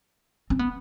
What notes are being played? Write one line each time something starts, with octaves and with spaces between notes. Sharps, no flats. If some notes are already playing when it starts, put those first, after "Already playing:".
C4
B3